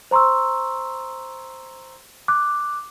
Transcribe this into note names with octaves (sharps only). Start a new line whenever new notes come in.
C5 A#5 C6 C#6 E6
D6 F#6